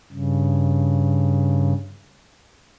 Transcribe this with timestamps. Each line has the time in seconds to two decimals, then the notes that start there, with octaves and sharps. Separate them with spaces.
0.12 G2 C#3